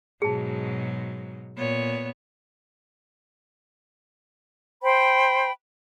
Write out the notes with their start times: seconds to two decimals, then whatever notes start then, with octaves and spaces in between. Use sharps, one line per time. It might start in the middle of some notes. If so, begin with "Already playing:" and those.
0.22 G#2 B2 F#3 G#4 A5
1.56 A#2 B3 C#5
4.82 C5 G5 B5